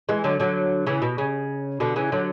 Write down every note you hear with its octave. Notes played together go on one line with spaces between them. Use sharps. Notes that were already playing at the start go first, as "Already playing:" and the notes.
E3 G#3
D3 F#3
D3 F#3
C#3 E3
B2
C#3
B2 D3
C#3 E3
D3 F#3